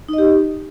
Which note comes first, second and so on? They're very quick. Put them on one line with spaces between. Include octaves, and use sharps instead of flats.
D#4 D#5 G4